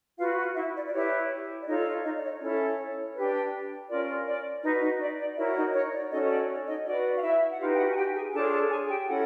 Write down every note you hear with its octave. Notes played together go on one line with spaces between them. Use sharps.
F4 F#4 B4 F5
F#4 F#5
E4 E5
D5
D5
E4 G4 B4 C#5
D5
D#4 F4 A4 C#5 D#5
D#4 D#5
D5
C#5
C#4 E4 A4 C#5
D4 G4 B4
C#4 F4 A#4 D5
D5
D#4 F#4 B4 D#5
D#4 D#5
D5
D5
E4 F#4 A#4 C#5 E5
D#4 D#5
C#5
D5
C#4 D#4 F#4 A4 D#5
C#5
D5
C#5
D#4 D#5
F#4 B4 D5
F5
E4 E5
F#5
D#4 F4 G4 B4 F5
G5
F#4 F#5
G#5
G4 G5
G#4 G#5
D4 F4 G#4 A4 C#5 A5
A4 A5
G#4 G#5
G4 G5
C#4 E4 F#4 A4 F#5